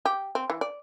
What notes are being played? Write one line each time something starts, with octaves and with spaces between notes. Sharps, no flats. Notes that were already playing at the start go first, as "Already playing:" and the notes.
G4
C4
E3
D5